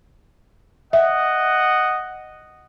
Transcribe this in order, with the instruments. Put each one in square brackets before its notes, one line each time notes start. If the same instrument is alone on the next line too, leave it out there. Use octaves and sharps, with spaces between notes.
[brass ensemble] D#5 F#5 [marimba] E5